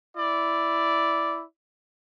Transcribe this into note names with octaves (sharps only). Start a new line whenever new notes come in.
E4 D5